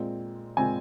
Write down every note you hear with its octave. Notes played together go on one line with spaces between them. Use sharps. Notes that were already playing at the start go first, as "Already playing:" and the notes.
Already playing: A#2 G#3 C4
A#2 G#3 C4 G#5